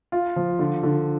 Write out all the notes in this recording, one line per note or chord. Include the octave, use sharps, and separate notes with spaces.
F4
F3
D3
D3